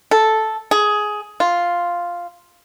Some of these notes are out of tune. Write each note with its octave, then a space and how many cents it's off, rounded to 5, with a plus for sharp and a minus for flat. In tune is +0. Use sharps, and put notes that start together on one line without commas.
A4 -5
G#4 +10
F4 +0